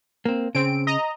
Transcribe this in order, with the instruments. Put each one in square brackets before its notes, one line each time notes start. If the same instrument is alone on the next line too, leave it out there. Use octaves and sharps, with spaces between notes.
[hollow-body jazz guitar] A#3 C4
[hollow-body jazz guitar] C#3 [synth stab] C4 D7
[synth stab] D#5 A#5